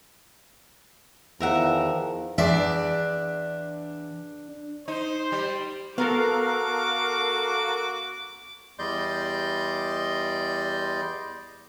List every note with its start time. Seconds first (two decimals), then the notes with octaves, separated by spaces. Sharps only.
1.40 E2 D#3 F3 A#4 E5 F#5
2.38 E2 D4 D5 E5
4.88 D#4 C5
5.32 G3
5.98 B3 F#4 A4 A#4 F5 D6
8.79 E2 G3 D5 D#5 C6 G6